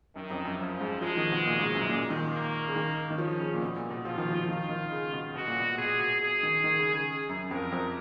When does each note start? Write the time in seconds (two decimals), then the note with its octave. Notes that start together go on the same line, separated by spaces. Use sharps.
0.16 F#2 D#3
0.31 F2
0.45 F#2
0.59 F#2 F3
0.80 G#2
1.01 F3 G#3
1.17 D#3
1.31 B2
1.46 A#2
1.59 G#2
1.75 F#2
1.89 A#2
2.10 D#3
2.32 A#3
2.68 C#3
2.76 D#3
3.10 D#3
3.18 F3 C#4
3.40 C#3
3.54 A#2
3.62 B2
3.76 A#2
3.90 B2
4.05 F3 F4
4.18 D#3
4.31 F3
4.48 D#3 F4
4.69 D#3
4.92 C#3
5.13 B2
5.34 B2 F#4
5.47 A#2
5.60 B2
5.78 B2 G#4
5.99 B2
6.22 G#4
6.43 D#3
6.64 D#3
6.79 C#3
6.93 C#3
7.29 F#2
7.51 F2 A#4
7.72 F2